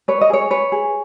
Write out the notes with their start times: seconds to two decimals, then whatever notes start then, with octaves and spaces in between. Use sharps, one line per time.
0.08 B4 C#5
0.21 D#5
0.30 G#4 C#5
0.51 B4 C#5
0.72 G#4